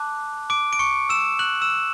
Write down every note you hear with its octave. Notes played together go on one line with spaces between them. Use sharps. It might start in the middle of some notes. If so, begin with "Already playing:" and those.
Already playing: A5 D6 F#6
D6 D7
D7
C#6 C#7
E6 E7
F#6 F#7
E6 E7